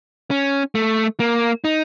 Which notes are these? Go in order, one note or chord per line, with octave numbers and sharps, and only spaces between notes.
C#4
A3
A#3
D#4